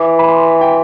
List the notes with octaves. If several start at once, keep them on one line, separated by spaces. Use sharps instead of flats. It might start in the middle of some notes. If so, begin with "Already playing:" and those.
Already playing: E3 D6
B5
C6
G5